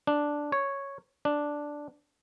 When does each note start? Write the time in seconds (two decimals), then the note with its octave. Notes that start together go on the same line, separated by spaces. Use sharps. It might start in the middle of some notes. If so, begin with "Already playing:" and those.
0.07 D4
0.52 C#5
1.25 D4